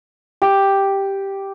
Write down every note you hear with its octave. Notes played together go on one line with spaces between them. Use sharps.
G4